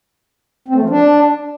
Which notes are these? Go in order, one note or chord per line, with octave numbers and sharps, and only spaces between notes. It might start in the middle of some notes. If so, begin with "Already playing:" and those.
C4
A3
F3
D4